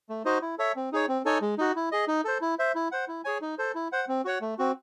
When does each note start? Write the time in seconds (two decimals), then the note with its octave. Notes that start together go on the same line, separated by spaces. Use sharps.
0.09 A3
0.25 D#4 F#4 C5 D#5
0.42 E4
0.58 A4 C#5 E5
0.76 C4
0.92 D#4 G#4 C#5
1.09 C4
1.25 D#4 A4 C#5 G#5
1.41 G#3
1.58 D#4 F#4
1.76 E4
1.92 G#4 D#5
2.08 D#4
2.25 A4 C5
2.41 E4
2.59 C5 E5
2.75 E4
2.92 C5 F#5
3.08 E4
3.24 G#4 C#5 G#5
3.42 D#4
3.58 A4 C5
3.75 E4
3.92 C5 F#5
4.08 C4
4.25 F#4 C#5 F#5
4.41 A3
4.58 C4 F#4